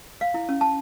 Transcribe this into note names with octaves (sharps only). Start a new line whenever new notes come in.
F5
E4
C#4
A5